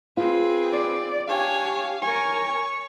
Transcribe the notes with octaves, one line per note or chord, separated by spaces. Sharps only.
C4 F4 G#4 B4
D5
D4 G4 C#5 F5 G#5
A#4 C#5 G#5 C#6